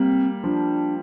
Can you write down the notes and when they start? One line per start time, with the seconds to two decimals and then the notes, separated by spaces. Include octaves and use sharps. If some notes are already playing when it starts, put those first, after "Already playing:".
Already playing: G3 A#3 C4
0.43 F3 D4